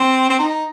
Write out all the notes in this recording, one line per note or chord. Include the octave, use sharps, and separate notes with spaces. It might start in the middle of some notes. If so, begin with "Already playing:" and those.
Already playing: C4
C4
D#4